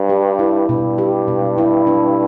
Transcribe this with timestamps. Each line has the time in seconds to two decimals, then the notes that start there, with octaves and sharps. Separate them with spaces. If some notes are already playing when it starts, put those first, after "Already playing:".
Already playing: G2
0.09 G4
0.39 E4
0.69 G2 B2
0.98 G4
1.28 B2
1.58 E4
1.87 D4